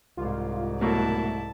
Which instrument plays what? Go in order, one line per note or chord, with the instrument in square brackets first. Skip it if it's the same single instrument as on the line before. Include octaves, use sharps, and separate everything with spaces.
[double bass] C2 G#2 [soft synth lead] F4
[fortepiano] B2 F#3 A#3 [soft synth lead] A3 [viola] E4 A5